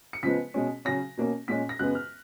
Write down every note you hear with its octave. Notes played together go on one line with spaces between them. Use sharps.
C#7
C#3 F3 G#3 B3 B6
B2 G#3 C#4
C#3 F#3 C#4 A#6
B2 A#3 C#4
A#2 G#3 C#4 B6
A#6
F#2 C#3 G#3 B3 F#6
F6